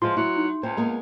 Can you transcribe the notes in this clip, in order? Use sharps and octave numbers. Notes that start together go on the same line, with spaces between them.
E3 F3 G#3 F4 C6
F#3 E4
D#4
C#2 C4 C5
G#3 A#3 B3 A#5